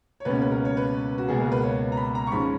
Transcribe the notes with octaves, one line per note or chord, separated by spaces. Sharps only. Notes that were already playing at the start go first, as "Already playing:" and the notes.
C#5
C#2 B2 A#3 C#4 B4
B4
A#4
C#5
B4
F#4
C#2 B2 A#3 G#4
A#4
B4
C#5
A#5
B5
A#5
C#6
G#2 F3 G#3 C#4 B5